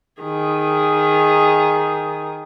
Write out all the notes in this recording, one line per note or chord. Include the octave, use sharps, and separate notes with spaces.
D#3 G#4